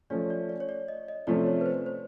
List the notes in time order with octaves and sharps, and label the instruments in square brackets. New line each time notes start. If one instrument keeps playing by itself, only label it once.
[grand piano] F3 A3 C#4 [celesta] D5
[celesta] D5
D5
C#5
D5
D#5
D#5
[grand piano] C3 F3 A3 C#4 [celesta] D5
[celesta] C#5
B4
C5
C5